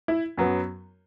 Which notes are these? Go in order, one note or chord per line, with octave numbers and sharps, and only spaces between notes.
E4
F#2 F#3 B3